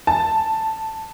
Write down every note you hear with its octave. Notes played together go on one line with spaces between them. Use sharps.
A5